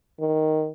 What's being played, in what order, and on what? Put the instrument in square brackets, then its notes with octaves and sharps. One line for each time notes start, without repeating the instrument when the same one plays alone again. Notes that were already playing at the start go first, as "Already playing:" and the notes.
[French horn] D#3